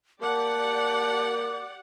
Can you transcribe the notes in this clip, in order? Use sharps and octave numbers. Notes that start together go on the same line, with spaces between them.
A#3 G4 D5 F#5 A5 D6